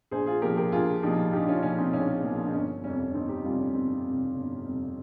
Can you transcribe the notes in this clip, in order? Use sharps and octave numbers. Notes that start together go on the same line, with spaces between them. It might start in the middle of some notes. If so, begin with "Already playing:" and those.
A#1 G#4 C5
F4 G#4
A#2 F3 G4 A#4
G4 A#4
A#1 F4 G#4
A#2 F3 D#4 G4
A#1 D#4 G4
C#4 F4
A#2 F3 C#4
C4 D#4
A#1 C#4
A#2 F3
D#4
G1 C#4
F2 C3 G3 C#4
C#4
G1 C4 D#4
D#4 G4
F2 C3 G3 C#4 F4
C#4
G1 C4
F2 C3 G3
G1
F2 C3 G3